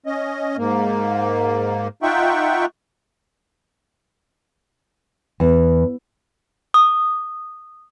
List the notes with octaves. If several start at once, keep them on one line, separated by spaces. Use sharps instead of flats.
C#4 D#5
G#2 A#3
D#4 F4 E5 F#5 G5 C#6
E2
D#6